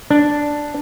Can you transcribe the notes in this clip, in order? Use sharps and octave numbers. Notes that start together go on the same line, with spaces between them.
D4